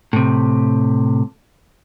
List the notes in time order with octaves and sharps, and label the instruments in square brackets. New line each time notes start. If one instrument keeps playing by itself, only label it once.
[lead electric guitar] A2 C3